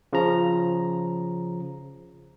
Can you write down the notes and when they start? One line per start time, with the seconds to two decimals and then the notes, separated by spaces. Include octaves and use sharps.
0.13 C#3 F3 A#5